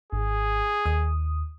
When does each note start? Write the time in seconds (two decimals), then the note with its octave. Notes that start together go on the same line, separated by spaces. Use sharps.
0.13 G#1 G#4
0.86 D#2 D#6